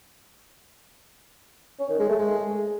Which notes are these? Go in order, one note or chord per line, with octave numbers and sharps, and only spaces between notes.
C#4
D#3
G#3
A3
G#3